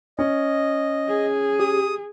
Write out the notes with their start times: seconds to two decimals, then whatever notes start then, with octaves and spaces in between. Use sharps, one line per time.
0.19 C#4 D#5
1.08 G#4
1.60 G4 D#6